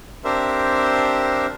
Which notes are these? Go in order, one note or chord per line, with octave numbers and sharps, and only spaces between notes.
C4 D4 G4 A#4 C5 E5